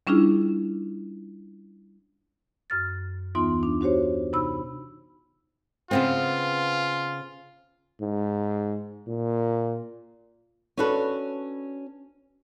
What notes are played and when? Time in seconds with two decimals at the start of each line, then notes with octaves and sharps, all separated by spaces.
0.07 G3 C#4 D4 E4 F4 G#4
2.70 F#2 F6 A6
3.35 D#2 E3 B3 D#4 F4 C6
3.63 D4
3.81 D4 F#4 G4 C5 C#5
4.33 C3 D#4 B5 E6
5.91 C#3 B3 C4 F4
8.01 G#2
9.07 A#2
10.77 C#4 D4 F#4 A4 B4